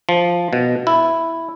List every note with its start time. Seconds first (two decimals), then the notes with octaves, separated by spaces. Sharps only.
0.09 F3
0.53 B2
0.87 E4